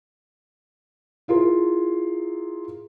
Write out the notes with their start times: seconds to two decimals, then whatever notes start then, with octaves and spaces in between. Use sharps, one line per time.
1.28 E4 F4 G#4 A#4